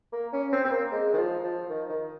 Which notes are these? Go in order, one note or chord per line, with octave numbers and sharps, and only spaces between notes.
A#3
C#4
C4
C4
A#3
G#3
D#3
F3
F3
D#3
D#3